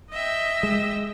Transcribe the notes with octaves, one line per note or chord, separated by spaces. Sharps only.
D#5 E5 G5
G#3